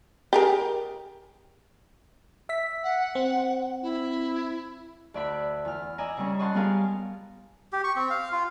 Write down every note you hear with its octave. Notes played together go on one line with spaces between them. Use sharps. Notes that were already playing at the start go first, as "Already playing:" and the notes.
G4 G#4 A#4
E5 B6
F#5
C4
E4
D2 D5 E5 B5
E2 F6
D5 D#5 G#5 A#5 E6
C#3 G3 C#4
C#5 D#5 F#5 A5 C6
G3 B3 G#4 A#4 F5
G4
C#6
C4
F5
F4